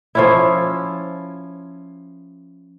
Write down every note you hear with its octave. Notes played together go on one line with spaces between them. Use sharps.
F3 C#4 E4